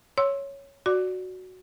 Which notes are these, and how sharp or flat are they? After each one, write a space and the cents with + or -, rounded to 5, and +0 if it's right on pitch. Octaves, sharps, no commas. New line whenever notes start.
C#5 +0 C6 +25 E6 +0
F#4 +0 D5 +0 D6 +0